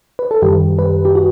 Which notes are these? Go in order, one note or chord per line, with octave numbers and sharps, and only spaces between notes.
B4
A4
F#2 D#3 G3 G4
B4
G4
F#4